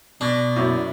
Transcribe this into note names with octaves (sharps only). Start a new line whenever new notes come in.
B2 D4
F#2 E4 C#5 D5